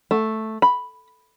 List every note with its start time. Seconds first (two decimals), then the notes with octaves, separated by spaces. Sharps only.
0.11 A3
0.62 B5